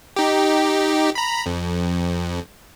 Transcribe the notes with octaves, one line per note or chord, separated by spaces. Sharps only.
D#4 G4
A#5 B5
F2